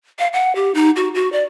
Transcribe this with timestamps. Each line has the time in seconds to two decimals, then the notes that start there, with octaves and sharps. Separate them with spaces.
0.19 F5
0.33 F#5
0.55 G4
0.75 D#4
0.96 F#4
1.15 F#4
1.32 D5